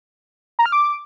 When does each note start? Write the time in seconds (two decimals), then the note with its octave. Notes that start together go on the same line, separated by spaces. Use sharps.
0.59 A#5
0.66 F6
0.72 D6